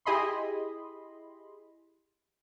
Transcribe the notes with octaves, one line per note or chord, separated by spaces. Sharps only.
E4 G4 G#4 D#5 B5 C6